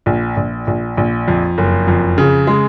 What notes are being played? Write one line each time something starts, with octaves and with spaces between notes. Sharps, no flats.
A#1
A#1
A#1
A#1
F2
F#1
F2
C#3
G#3